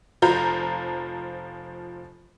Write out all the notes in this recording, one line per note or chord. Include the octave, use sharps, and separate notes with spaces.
F1 F3 F4 A#5 G6